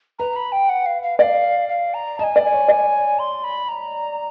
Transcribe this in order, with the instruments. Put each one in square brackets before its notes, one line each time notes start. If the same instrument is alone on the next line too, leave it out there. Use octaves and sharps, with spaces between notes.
[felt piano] B4 [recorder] A#5
[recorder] B5
G5
F#5
F5
F5
[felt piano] D5 [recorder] F#5
[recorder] F5
F5
A#5
[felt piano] D#5 [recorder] A5
[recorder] G#5
[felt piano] D5
[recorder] G#5
[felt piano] C#5
D5
[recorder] C6
B5
A#5